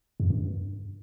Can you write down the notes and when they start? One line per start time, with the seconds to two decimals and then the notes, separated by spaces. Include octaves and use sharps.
0.20 F#2
0.30 G2